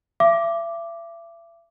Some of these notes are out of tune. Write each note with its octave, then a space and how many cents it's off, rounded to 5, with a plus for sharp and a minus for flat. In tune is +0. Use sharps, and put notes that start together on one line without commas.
E5 +35 D6 +0